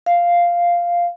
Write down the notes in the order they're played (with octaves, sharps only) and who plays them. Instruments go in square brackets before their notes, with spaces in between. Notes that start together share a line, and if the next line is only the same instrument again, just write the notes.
[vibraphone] F5